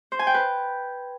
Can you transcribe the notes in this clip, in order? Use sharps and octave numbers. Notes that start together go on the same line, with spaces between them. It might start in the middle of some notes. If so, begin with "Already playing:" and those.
C5
G#5
G5
B4